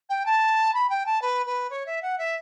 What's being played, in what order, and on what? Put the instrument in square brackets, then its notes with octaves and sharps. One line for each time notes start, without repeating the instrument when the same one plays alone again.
[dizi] G5
A5
B5
G5
A5
B4
B4
C#5
E5
F#5
E5